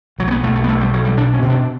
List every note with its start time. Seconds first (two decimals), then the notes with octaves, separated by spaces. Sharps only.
0.19 B1 F#3
0.28 A3
0.31 B3
0.43 B1 A3
0.56 A3
0.64 B3
0.68 B1 A3
0.80 G3
0.93 B1 F#3
1.05 G3
1.17 B2 D4
1.34 C#4
1.42 B2
1.50 D4